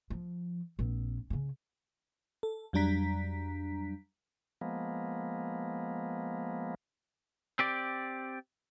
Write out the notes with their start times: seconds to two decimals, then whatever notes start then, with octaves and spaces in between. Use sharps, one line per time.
0.10 F3
0.79 A#1 C4
1.30 C#3 C#4
2.43 A4
2.73 F2 F#3 G3 D4 A#5 B6
4.61 F3 G#3 A#3 B3
7.59 C4 G4 D5